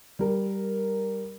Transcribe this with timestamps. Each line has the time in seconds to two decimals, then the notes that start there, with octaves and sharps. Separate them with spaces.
0.19 G3 A#4